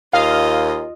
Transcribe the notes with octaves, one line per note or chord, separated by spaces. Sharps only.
D#2 F4 D#5 F5